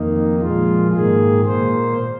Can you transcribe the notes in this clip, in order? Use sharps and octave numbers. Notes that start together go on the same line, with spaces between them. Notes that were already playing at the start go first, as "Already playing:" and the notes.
Already playing: F2 D#3 A#3 D#4
A#2 F3 G#3 F4
G#2 D#3 A#3 G#4
A#2 A#3 C5